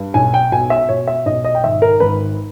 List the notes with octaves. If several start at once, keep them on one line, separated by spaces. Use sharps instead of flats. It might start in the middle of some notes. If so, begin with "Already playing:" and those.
Already playing: G2
B1 G#5
G5
B2 G#5
E5
B2 C#5
E5
B1 D#5
D#5
G5
G#1 E5
A#4
G#1 B4